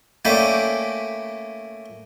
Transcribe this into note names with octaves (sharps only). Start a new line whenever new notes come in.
A3 A#3 C#4 D5 G5 B5